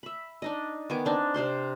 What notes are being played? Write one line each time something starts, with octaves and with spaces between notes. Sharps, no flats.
E5 B5
D4 D#4 D#5
D#3 B3 G#5 D6
C4 D4 D#4
C3 D4 C5 C6